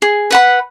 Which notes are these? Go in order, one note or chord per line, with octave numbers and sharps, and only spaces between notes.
G#4
B4 F#5 B5